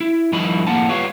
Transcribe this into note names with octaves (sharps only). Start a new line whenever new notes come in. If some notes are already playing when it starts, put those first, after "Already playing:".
E4
G2 D#3 F3 E4 D#5 B5
F2 A2 A#3 F#5 A5
G3 B3 F4 C#5